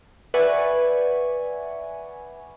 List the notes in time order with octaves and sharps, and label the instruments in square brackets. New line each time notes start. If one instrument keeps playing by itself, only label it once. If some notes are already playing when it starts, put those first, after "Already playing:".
[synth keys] B4 D5 E5 F#5 G#5 C#6